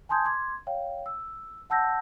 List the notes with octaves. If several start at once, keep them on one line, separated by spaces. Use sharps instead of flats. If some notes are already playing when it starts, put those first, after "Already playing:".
G#5 A5 C6 D#6 G6 G#6
C6 D6 G#6
C#5 F5 G5
E6
F#5 A5 E6 G6 A#6